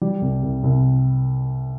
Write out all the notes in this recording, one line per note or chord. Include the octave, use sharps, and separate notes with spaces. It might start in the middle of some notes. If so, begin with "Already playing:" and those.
G3
C2
C2
C2